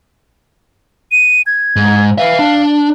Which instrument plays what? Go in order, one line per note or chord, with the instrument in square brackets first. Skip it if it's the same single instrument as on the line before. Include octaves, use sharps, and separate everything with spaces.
[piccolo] D#7
G#6
[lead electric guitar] G#2
[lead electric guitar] B4 E5 [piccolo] F5
[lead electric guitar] D4